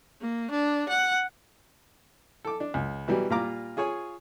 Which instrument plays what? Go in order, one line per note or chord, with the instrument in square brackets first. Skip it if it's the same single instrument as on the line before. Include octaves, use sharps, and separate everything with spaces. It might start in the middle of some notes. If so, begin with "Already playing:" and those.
[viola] A#3
D4
F#5
[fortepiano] A4 D6
D4
C#2
B2 E3 F#3 G3
A#2 G3 F4 F5 A#5 D6
F4 G#4 C#5 G#5